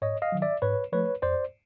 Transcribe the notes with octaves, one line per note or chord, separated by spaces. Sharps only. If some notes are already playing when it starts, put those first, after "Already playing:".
G#2 C#5 D#5
D#5 F5
D#3 F#3
D5 E5
G#2 B4 C#5
F3 A3 B4 C#5
F2 C5 D5